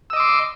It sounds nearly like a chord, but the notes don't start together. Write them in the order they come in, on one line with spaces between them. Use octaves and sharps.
E6 D#5 D6 C6